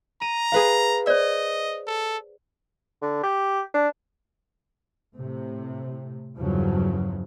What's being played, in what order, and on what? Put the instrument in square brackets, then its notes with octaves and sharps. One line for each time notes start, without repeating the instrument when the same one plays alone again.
[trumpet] A#5 [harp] D#7
[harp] G#4 B4 F5
[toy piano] C5 D5 [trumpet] D#5
[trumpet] A4
[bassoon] D3
G4
D4
[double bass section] A2 C3
E2 G2 C#3 F3 F#3